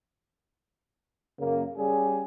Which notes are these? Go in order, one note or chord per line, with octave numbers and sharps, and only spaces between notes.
F#2 C#3 A#3
G3 C#4 G#4